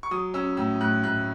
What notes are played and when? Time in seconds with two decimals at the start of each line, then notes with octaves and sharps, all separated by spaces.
0.03 C#6
0.11 F#3 D#6
0.34 C#4 E6
0.57 A2 E6
0.81 A2 F#6
1.04 A2 F#6